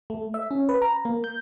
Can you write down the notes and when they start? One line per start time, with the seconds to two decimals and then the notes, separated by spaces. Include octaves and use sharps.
0.10 A3
0.34 E5
0.51 C#4
0.69 B4
0.82 A#5
1.05 A#3
1.24 G6